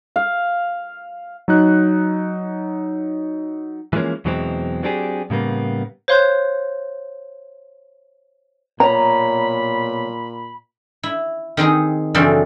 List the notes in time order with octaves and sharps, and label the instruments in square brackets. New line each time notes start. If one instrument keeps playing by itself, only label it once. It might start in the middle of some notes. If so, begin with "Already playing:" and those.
[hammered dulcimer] F5
[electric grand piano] F#3 D#4 F#6
[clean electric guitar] E3 F3 G#3 A#3 C#4
E2 B2 E3 F#3 G#3 C4
F#3 C4 D4 G4 G#4
A2 C#3 G3 A#3 B3
[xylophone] C5 C#5 F5 C6 F#6 G6
[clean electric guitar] B1 C#5 [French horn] A#2 [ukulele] A#5 [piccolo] B5
[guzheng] E4
D#3 C4 D#4 G#4
F#2 C#3 E3 C4 D4 A4